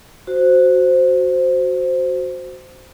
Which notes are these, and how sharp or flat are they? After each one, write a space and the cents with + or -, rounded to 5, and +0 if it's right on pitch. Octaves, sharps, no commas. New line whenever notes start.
F#4 +0 C5 -5